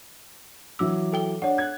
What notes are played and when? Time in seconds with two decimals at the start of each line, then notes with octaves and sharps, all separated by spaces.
0.79 E3 F#3 D6 E6
1.13 A4 G5 G7
1.42 D4 C#5 F#5
1.58 F#6 G#6